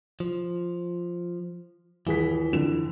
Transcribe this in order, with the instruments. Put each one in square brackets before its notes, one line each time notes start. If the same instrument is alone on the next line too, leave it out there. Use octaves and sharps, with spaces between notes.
[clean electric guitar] F3
[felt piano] D#1 G#4 B6 [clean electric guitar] E3
[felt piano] F2 D3 E7